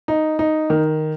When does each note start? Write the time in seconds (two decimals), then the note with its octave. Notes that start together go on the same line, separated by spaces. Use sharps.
0.08 D#4
0.39 D#4
0.70 D#3